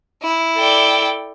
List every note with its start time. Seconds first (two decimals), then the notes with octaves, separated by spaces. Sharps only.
0.23 E4
0.57 A4 D5 G5